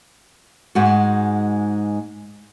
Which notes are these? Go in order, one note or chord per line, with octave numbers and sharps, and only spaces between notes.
G#2 G#3 F#4